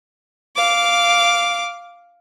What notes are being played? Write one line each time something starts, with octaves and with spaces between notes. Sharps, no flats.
F5 D6